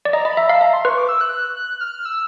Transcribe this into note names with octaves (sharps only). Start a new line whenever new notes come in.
D5
D#5 A#5
D#5 B5
E5 A#5
F5 A5
E5 A#5
C6
B4 C#6
D6
E6
F#6
F#6
F#6
F6
E6